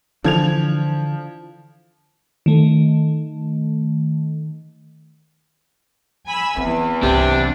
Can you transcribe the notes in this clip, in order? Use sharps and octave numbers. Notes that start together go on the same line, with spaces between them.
D3 E3 F3 D4 G#6 F7
D#3 A3
G#5 B5 E6
E2 E3 C4
C2 F#2 C3 D4